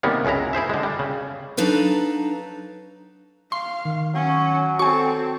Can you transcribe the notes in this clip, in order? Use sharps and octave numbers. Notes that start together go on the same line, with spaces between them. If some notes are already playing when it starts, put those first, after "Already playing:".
C3 D#3 G3 A#3 B3 C#4
C#2 F#2 G#3 E4 A#5
E4 G#4 C5 E5
D3 G#3
G3
C#3
F#3 D4 D#4 A4 B4 F5
F5 C6
D#3
F#3 C#4
C4 F#4 A4 G#5 C#6